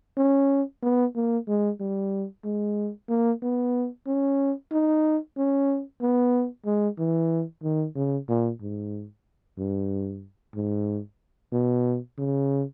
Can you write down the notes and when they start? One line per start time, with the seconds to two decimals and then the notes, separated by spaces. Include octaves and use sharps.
0.17 C#4
0.83 B3
1.15 A#3
1.48 G#3
1.80 G3
2.44 G#3
3.09 A#3
3.42 B3
4.07 C#4
4.72 D#4
5.37 C#4
6.02 B3
6.66 G#3
6.98 E3
7.63 D#3
7.95 C#3
8.29 A#2
8.61 G#2
9.58 G2
10.55 G#2
11.52 B2
12.18 C#3